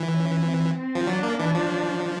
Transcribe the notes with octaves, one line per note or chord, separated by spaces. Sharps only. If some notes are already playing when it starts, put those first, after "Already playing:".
Already playing: E3
C#4
C4
C4
F3
F#3 D4
A#3
E3
F3